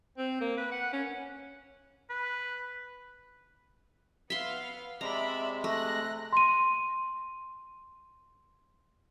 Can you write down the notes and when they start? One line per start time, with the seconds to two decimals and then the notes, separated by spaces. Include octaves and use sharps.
0.18 C4
0.41 A#3
0.58 B4
0.71 F#5
0.93 C#4
2.10 B4
4.30 B3 E5 F5 C6
5.01 C3 G#3 D5 E5 A#5 B5
5.64 A3 F#6 A#6
6.33 C6 D#7